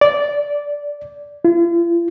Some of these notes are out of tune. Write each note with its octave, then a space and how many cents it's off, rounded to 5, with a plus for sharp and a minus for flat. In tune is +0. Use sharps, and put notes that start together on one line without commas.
D5 -10
F4 -45